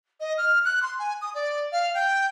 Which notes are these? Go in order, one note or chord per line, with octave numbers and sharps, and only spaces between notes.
D#5
F6
F#6
C6
G#5
D#6
D5
F5
G5